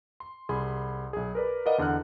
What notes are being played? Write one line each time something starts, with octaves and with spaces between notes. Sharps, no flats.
C6
C2 G#4 B5 C6
B1 G#4
A#4 B4 D5
A#4 B4 D5 D#5 F5 F#5
E2 D3 F#5 F6 F#6